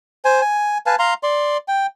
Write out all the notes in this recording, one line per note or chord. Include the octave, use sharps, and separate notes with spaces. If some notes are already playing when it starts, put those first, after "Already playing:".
C5 G#5
G#5
B4 F5 G#5 A5
F5 A#5 C6
D5 C6
G5